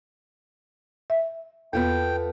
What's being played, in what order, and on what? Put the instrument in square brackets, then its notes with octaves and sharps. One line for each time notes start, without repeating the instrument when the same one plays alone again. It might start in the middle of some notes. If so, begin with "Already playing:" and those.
[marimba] E5
[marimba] E2 [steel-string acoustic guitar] B3 F4 A4 [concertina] G5